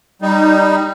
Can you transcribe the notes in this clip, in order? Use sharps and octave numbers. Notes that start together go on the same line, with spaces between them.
G3 D#4